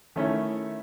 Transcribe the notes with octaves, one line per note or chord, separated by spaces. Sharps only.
D#3 A3 C#4 E4